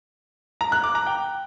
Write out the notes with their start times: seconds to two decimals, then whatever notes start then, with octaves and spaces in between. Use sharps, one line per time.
0.61 A#5
0.72 F#6
0.84 D6
0.95 A#5
1.06 G5